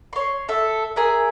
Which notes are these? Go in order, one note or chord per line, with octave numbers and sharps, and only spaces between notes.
C#5 C6
A4 E5
G#4 A#4 E5